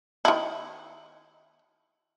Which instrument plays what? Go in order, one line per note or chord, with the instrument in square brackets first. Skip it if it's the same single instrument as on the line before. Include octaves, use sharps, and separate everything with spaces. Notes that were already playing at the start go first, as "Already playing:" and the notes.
[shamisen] D#3 E4